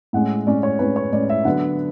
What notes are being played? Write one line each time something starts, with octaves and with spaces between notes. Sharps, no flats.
A2 G#3 C#4 F#5
A2 G#3 C#4 D5
C#5
A2 G#3 C#4 B4
C#5
A2 G#3 C#4 D5
E5
D3 F#3 B3 D4 F#5